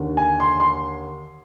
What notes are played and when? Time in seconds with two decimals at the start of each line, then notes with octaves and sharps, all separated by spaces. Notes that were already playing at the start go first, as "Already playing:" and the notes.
Already playing: D#2 D3
0.17 G#5
0.40 C6
0.60 C6